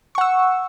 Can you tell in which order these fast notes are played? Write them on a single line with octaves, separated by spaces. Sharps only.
C#6 F#5 E6